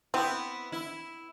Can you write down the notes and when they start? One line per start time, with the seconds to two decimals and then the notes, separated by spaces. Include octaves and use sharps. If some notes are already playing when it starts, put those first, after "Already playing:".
0.14 B3 C4 E4
0.72 E4